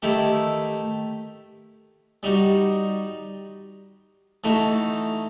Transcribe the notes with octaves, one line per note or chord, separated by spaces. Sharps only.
D#3 A3 E4 G4
G3 D#4 F#4
E3 A3 D#4 F#4